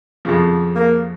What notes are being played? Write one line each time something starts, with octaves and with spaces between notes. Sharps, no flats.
F2 C#3 F3
A#3